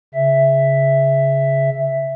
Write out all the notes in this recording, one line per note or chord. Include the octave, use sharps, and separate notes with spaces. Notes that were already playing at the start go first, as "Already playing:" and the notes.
C#3 E5